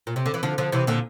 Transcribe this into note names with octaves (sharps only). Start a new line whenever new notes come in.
A#2
C3
D3
E3
D3 F3
D3 F3
C3 E3
A#2 D3